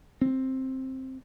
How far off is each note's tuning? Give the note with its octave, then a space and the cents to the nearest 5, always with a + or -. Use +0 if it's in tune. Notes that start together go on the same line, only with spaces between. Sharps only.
C4 +10